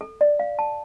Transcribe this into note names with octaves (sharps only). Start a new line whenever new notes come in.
A4
D5
F5
A5